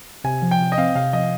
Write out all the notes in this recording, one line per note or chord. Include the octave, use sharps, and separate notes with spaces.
C3 G#5
F3
G5
C3
D#5
C4 F5
C3 F5
F3 D#5